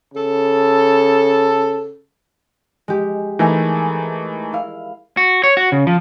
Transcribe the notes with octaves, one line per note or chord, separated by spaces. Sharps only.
C#3 A4
G#3 G4
E3 A3 D#4 G#4 A#4 G#5
E4 F5
F#4
C#5
F#4
C#3
F3